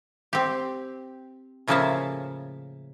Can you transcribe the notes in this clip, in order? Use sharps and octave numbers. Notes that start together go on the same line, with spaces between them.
C4 G4
A2 C#3 F3 A#3 E5 A5